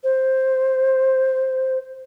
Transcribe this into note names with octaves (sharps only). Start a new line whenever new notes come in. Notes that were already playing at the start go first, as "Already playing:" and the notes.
C5